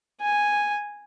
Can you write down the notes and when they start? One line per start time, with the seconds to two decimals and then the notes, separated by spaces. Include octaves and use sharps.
0.21 G#5